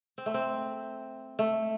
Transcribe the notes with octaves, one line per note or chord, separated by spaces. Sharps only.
C4
A3
C4
A3